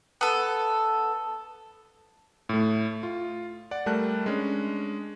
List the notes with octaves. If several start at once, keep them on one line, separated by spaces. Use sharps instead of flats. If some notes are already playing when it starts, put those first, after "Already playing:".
B3 A4
A2 A3
F4
D5 F#5
G3 A3 A#4 A5 F#6
G#3 C#4 D4